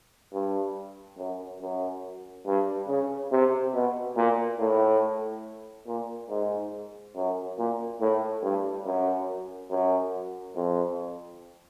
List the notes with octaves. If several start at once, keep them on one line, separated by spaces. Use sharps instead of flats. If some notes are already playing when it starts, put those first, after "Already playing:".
G2
F#2
F#2
G2
C#3
C3
B2
A#2
A2
A#2
G#2
F#2
A#2
A2
G2
F#2
F#2
F2